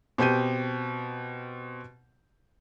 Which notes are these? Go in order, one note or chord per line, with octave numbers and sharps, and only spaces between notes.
B2 C4 G4 G6 D#7